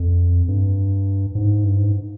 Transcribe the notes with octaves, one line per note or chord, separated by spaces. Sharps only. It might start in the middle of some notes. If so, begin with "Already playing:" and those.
Already playing: F2
G2
G#2
G2
G#2